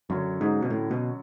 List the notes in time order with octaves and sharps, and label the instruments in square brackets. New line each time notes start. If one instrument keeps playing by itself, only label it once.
[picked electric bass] F#2 [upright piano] D3 F#3 C#4
[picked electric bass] G#2
B2
A2
B2